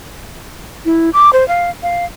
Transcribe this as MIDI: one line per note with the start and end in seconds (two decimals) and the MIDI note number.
0.85 1.10 64
1.13 1.30 86
1.33 1.46 72
1.48 1.70 77
1.83 2.05 77